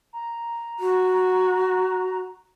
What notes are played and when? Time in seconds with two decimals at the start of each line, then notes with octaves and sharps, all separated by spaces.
0.13 A#5
0.80 F#4